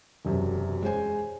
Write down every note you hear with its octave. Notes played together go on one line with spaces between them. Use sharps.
E1 F#2 C3
G#3 C#4 C5 G#5